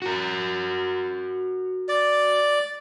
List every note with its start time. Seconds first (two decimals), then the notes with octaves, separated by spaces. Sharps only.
0.02 F#4 A#4
1.89 D5